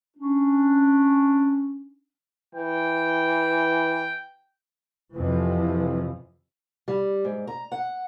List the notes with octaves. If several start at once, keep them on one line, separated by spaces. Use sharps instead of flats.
C#4 D4
E3 G5
F2 C3 E3 F3
G3
G#2
A#5
F#5